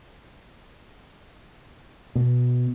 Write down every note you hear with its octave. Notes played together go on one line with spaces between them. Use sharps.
B2